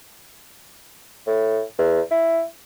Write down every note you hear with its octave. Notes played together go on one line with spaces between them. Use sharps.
A2
E2
E4